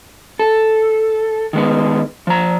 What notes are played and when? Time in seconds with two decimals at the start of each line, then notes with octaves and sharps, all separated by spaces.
0.39 A4
1.53 D#3 G#3 B3
2.27 F3 A#5